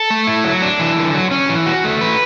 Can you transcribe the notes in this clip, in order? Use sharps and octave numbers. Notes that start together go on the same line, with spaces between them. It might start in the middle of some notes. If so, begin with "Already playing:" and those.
Already playing: A4
A3
E4
F#3
D4
E3
D3
F#3
C#4
E3
F#4
A3
B4